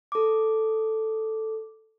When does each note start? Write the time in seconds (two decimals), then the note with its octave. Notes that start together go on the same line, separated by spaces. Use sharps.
0.12 A4 D6